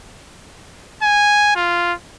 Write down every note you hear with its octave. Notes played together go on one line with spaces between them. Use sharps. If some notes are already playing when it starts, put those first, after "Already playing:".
G#5
F4